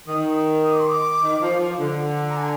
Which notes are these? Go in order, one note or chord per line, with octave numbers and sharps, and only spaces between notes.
D#3 D#6
D#6
D6
C6
D6
D#3
F3
F3
D3
A#5
G#5